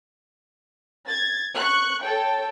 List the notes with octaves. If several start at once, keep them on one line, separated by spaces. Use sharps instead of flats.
G#6 A6
C#6 F#6
A4 C#5 G5